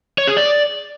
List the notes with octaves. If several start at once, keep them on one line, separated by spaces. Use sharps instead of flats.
C#5
G#4
D5